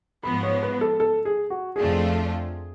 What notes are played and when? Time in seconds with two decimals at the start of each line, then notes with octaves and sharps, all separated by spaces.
0.24 G#2 F3 B3 B5
0.43 C#5
0.63 B4
0.81 A4
1.00 A4
1.25 G#4
1.50 F#4
1.76 F2 F3 A3 D4 F4 G#4